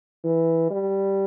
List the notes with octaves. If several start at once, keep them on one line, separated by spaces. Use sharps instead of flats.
E3
G3